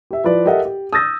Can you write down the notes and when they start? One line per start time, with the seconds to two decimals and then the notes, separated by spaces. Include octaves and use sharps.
0.11 G4 E5
0.24 F3 E4 B4 D5
0.46 G4 A4 A#4 D#5 E5 F#5
0.65 G4
0.93 D#6 E6 G6 A6 A#6